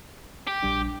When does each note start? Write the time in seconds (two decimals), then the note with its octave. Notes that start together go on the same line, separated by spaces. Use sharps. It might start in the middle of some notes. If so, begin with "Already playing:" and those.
0.48 G4
0.63 A#1 G3 D4